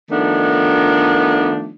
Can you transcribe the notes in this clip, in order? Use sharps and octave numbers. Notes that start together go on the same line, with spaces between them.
D#3 F3 A3 B3 D4 D#4